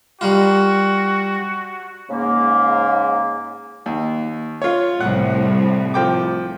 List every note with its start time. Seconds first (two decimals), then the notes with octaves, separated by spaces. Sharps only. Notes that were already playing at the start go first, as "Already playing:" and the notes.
0.21 G3 A#3 F4 F#4
2.10 G#2 C#3 A#3
3.86 D#2
4.62 F4 C#5
5.01 C2 A2 F#5
5.94 F3 G5 D6